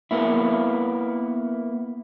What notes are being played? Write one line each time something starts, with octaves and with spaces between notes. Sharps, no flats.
A#3 B3 E4